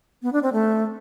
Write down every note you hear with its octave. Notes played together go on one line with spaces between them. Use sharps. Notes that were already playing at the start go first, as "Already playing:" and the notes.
B3
D4
C4
A3